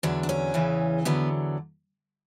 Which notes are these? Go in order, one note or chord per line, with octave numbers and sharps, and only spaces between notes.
E2 D3 F#3 D4
D4
C#4
E2 C#3 E3
E2 D3 F#3 B3